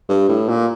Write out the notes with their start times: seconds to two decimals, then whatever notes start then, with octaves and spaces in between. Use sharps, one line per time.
0.09 G2
0.28 A2
0.49 A#2